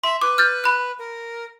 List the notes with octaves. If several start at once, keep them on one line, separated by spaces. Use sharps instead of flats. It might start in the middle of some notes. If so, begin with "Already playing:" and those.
E5 C6
B4 D6
F6 G6 A6
B5 F#6
A#4